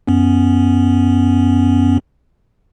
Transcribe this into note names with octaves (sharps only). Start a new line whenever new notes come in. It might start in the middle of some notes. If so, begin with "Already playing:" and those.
F#2 B3 C#4